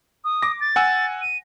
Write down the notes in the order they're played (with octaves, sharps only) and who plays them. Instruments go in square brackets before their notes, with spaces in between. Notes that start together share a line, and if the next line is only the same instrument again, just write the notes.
[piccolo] D#6
[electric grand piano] D6 A#6
[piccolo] A6
[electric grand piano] F#5 G#5 E6
[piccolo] D#7